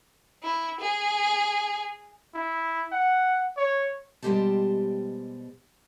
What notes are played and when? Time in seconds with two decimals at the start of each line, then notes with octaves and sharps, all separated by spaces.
0.43 E4
0.81 G#4
2.34 E4
2.92 F#5
3.57 C#5
4.22 B2 G3 G#3 G4 C5 A5